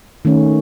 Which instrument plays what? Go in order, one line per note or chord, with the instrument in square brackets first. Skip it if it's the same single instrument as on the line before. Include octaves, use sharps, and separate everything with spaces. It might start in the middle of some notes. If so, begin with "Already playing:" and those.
[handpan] D#3 A3 C#4